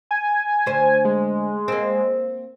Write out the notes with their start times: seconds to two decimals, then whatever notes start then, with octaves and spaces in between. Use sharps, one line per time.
0.11 G#5
0.66 D2 C5
1.05 G#3
1.68 A#3 C4